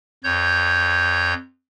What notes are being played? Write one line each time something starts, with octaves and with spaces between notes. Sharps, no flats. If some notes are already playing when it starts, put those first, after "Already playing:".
F2 C#5 G6